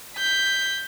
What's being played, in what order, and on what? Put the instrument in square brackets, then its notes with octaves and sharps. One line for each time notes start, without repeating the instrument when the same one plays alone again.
[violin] G6 B6